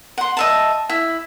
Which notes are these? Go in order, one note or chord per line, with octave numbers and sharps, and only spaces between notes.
F#5 C6
D#5 E5 A5
E4